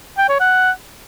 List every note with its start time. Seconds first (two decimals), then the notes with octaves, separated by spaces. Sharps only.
0.18 G5
0.29 C#5
0.40 F#5